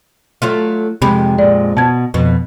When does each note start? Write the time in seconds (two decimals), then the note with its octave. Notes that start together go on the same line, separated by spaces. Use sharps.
0.42 F#3 A3 F4
1.02 F2 C3 G#3 G4 B5
1.39 A#2 G#3 D5
1.77 B2 A5 G#6
2.14 F2 B2